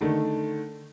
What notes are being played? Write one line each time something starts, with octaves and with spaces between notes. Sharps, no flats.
D3 D#3 A3